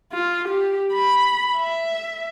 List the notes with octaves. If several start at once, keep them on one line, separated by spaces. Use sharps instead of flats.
F4
G4
B5
E5